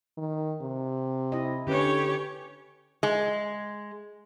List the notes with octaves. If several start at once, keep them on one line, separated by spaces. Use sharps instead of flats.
D#3
C3
E4 D#5
D3 C#4 G4 B4 C#5
G#3